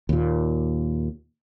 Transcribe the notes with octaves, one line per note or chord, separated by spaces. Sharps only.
D#2 A#2